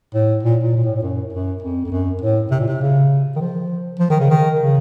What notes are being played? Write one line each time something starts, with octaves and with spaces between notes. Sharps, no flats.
A2
A#2
A#2
A#2
A2
A2
F#2
F#2
F2
F2
F#2
A2
C3
A#2
C3
C#3
D#3
F3
F3
D#3
C#3
D#3
C#3